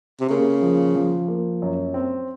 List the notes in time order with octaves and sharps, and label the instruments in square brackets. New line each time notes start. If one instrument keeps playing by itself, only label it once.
[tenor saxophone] C3
[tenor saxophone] C#3 [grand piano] A#3
[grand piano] F3
F3
A#3
F#2
C4